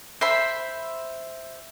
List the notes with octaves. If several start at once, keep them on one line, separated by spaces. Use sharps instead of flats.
C5 E5 B5